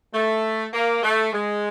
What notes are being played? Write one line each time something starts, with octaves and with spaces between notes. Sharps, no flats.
A3
A#3
A3
G#3